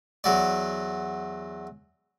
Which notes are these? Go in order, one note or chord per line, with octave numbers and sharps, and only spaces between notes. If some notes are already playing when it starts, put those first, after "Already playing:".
E2 F#3 D5